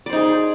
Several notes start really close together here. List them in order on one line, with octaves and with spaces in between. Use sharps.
D5 C5 D#4 G#4